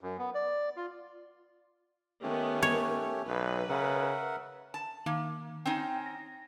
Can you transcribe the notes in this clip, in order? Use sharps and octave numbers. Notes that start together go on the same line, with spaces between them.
F#2
B3
D5
F4
D#3 A3 B3 C#4 G4
C#5
B1 B4
C#3 A#4 E5 F#5
A5
D#3 A#3
C4 C#4 D#4 G5
A#6